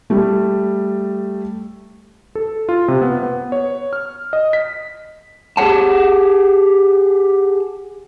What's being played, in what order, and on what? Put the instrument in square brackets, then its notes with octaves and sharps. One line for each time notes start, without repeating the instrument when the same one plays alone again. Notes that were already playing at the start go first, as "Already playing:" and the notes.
[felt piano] G3 A3
[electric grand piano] A4
F4
C3
B3
B3
C#5
F6
D#5
B6
[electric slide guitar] G4 G#4 B4 C#5 F#5 A5